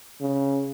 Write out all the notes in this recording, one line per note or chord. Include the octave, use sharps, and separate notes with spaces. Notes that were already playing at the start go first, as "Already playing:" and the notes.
C#3